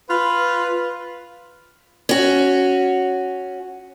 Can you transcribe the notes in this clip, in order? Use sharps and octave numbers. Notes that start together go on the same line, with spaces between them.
F4 B4
C#4 F#4